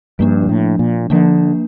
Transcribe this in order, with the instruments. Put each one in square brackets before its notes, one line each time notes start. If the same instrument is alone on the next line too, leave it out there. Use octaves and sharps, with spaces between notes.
[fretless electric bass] G2 [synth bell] F3 A#3 D4
[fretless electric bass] A#2
A2
A#2
[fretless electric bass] D3 [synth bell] F3 A#3 D4